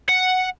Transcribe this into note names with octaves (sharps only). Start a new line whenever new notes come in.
F#5